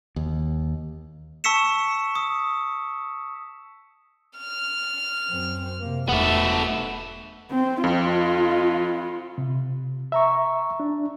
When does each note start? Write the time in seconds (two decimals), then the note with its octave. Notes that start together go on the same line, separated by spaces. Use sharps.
0.16 D#2
1.44 A5 C#6 E6 B6 C#7 E7
2.15 D#6
4.38 F6
5.30 F#2 C4
5.80 C3 A#3
6.09 E1 B2 A3 B3 A4 E5
7.51 C4
7.84 F2 F4
9.38 C3
10.12 E5 A#5 C#6
10.80 D4